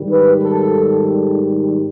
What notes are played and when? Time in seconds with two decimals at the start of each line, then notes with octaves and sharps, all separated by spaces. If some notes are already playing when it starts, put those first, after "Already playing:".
Already playing: G#2 D#3 G3
0.10 B4
0.41 A4